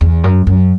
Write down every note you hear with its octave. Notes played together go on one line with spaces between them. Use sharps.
E2
F#2
F#2